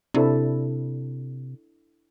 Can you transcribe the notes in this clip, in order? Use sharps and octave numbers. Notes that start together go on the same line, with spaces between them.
C3 D4 E4 A4